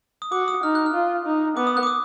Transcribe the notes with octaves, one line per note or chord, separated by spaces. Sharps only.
D#6
F#4 D6
D#6
D#4 F6
F#6
F6
F4
D#4
B3 D6
D#6
F#6
D6
D#6